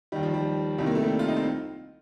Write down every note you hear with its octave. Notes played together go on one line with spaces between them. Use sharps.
D#2 D#3 G3
F3
G3
C2 C3 D#3 G3
A#3
A3
G3
F4
D#4
C4